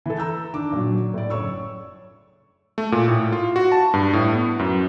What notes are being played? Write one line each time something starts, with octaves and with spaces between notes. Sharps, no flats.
E3 A4
A#5 E6 G6
D#3 D4 D6
A#2 D3 F#3
A2 D5
F#1 C#5 C#6 E6
A3
A#2
A2
F4
F#4
A5
G2
A2
B3
F#2